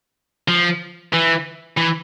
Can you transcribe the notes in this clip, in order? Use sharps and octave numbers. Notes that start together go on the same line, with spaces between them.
F3
E3
E3